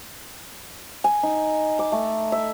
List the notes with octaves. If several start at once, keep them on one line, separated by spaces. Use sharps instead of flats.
G#5
D#4
D6
A3
E5